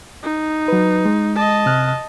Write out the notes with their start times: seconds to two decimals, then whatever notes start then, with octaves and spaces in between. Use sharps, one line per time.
0.23 D#4
0.68 F#3 B4
1.05 G#3
1.36 D#5 A5
1.66 C3 F6 F#6